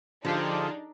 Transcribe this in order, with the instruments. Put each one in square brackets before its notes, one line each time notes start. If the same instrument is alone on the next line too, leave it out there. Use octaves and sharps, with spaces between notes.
[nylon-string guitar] D3 [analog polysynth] F3 G4 G#4 [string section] D4 D#4 [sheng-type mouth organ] F4 A5